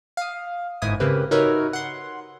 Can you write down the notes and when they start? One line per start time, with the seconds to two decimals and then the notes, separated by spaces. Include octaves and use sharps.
0.17 F5 D#6
0.82 G1 G#2 E4 G#5 D#6
1.00 C#3 A#3 C4 G4 B4
1.31 D#4 F#4 A#4 B4 C#5 E5
1.73 F#5 C6